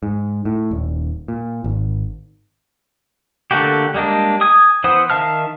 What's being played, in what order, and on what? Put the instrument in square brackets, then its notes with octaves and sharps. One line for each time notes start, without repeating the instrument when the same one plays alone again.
[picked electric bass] G#2
A2
D#1
A#2
G#1
[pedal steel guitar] D3 A3 A#3 F#4 G4
G3 G#3 A#3 D4
G#5 D#6
E3 B3 C5 F#5 D#6
D#3 E5 F5 A5 F6